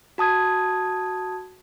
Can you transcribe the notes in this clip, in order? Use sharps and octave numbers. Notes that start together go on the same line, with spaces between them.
F#4 A5 D#6 G#6